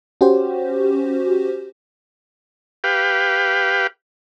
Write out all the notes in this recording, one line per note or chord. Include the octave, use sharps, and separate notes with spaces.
C#4 F#4 G4 C5
G4 B4 F5 G5